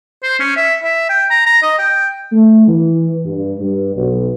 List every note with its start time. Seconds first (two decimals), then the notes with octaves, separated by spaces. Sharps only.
0.23 C5
0.40 C#4
0.57 E5
0.83 E5
1.09 G5
1.30 A#5
1.46 A#5
1.63 D#5
1.79 G5
2.32 A3
2.68 E3
3.26 G2
3.59 G2
3.96 B1